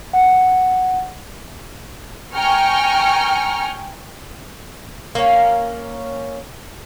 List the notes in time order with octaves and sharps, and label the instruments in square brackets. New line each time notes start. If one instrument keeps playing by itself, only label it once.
[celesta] F#5
[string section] G5 G#5 A#5 C#6 F6
[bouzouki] A#3 C#4